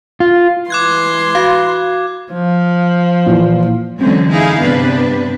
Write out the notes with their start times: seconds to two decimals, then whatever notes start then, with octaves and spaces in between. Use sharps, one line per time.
0.20 F4
0.70 E3 C6 D6 F#6 G#6
1.35 F#4 F5
2.32 F3
3.26 A#2 E3
3.98 D3 E3 F#3 G#3 C4 C#4
4.32 D#4 E4 G#4 F5
4.61 G2 C3 B3 D4 B4